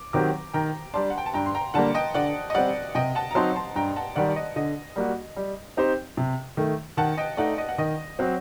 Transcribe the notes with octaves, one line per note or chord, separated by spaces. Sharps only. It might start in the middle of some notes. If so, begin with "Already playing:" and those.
Already playing: D6
D#3 F#3 C4 G4 A#5 D6
D#3 G5 A#5
G3 D4 A5 C6
F#5
G5
A5
G2 G5 A#5
C6
G5 A#5
D3 G3 A#3 F#5 A5
D#5 G5
D3 D5 F#5
D#5
G3 C4 D5 F#5
C3 D#5 G5
F#5 A5
A#5
F#3 C4 D#4 A5 C6
A5 C6
G2 G5 A#5
F#5 A5
D#3 G3 D5 F#5
D5
D#5
D3 D#5
G3 A#3 F#4
G3
C4 D#4 G4 C5
C3
D#3 A3
D#3 F#5 A5
D#5 G5
A3 D#4 D5 F#5
D#5
F#5
D#3 D#5
F#3 C4